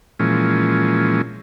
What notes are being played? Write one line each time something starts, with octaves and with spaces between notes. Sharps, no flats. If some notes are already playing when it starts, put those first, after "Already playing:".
A#2 E3 F3 G#3 C#4